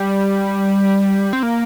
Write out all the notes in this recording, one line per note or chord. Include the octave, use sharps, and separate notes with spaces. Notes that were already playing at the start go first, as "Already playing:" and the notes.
Already playing: G3
C4
A#3